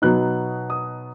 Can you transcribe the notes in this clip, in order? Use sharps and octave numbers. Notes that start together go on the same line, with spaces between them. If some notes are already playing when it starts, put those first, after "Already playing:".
B2 F#3 B3 D#4 F#6
D#6